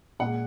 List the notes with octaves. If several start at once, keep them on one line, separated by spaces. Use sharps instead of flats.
A#2 G#3 F#5